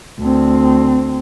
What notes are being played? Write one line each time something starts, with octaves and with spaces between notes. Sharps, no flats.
D2 C4